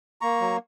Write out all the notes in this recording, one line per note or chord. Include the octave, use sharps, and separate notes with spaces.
A#3 A#5 C#6
F#3